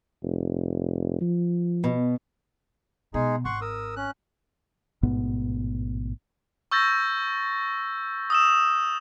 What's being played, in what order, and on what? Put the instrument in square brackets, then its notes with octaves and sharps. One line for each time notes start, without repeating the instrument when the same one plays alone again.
[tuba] F1
F3
[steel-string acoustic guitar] B2
[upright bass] B2 [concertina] G#3 D#4 G#4
[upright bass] G#1 [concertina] F#5 C6 C#6
[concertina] A#4 D#6 E6
C#4 F#6
[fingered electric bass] A1 G#2 B2 B3
[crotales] C#6 E6 G6 A6 A#6
D#6 E6 E7